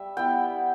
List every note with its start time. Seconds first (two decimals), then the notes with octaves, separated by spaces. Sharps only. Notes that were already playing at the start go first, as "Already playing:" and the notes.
Already playing: G3 E5
0.17 B3 E4 G5